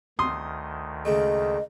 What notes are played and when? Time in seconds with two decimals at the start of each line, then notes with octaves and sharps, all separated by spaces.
0.19 D2 D#3 C6 D#6
1.05 C#3 G#3 A3 D#5